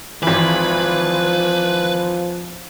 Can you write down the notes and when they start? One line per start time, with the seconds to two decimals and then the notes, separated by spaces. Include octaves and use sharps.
0.23 G#1 E3 F3 B4